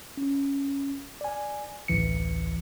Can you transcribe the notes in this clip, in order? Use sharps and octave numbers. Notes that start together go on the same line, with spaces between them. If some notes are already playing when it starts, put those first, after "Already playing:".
C#4
D5 G#5
A1 D2 E3 C#7